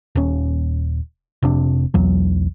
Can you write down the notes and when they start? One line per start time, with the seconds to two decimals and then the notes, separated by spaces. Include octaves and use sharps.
0.15 D#1 C#4
1.42 F1 C3 D4
1.94 B1 E2 F#3